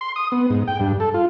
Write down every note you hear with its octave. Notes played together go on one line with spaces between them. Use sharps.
C6
D#6
B3
G#2
G5
G2
A4
F4